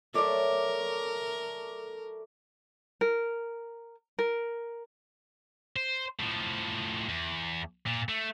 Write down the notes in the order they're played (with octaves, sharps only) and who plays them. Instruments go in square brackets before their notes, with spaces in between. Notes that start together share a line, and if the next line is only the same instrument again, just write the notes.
[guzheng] F#3 [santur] A3 D5 E5 [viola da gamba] A#4
[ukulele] A#4
A#4
[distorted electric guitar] C5
A2 F3
E2
A#2
A3